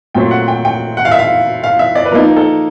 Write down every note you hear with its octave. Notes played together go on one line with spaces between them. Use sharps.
A#2 F#3 A3 C4 G5
F#5
G5
G5
F#5
F5
E5
F5
F5
E5
D5
B4
F3 A#3 D#4 A#4
A4